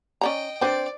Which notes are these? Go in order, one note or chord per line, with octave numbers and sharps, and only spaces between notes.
C#4 D5 D#5 G5 A#5
C4 D4 B4 C5 D5